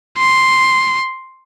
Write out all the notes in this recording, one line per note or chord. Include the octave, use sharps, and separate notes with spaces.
C6